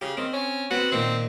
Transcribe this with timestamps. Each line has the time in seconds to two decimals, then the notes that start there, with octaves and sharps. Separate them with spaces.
0.01 C#3 G4
0.17 D#3 C4
0.33 C#4
0.71 B3 C4 F#4
0.92 A#2 D#3 C4